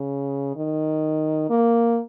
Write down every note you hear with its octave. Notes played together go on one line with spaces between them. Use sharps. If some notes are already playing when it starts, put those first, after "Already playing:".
Already playing: C#3
D#3
A#3